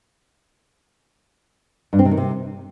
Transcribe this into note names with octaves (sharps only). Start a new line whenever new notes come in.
G2
C4
C3
D#3
C3